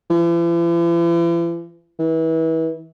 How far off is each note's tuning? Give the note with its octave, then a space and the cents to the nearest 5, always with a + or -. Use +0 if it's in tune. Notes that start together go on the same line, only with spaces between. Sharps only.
E3 +45
E3 -30